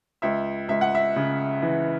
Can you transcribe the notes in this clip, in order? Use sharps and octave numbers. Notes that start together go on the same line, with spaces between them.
C#2 E5
C#2 E5
F#5
E5
C#3
E3